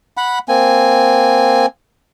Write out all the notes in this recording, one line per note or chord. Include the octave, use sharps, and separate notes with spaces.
F#5 B5
A#3 C4 G#5